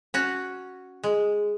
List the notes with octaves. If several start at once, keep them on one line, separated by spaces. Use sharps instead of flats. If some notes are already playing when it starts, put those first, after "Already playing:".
C#4 F#4
G#3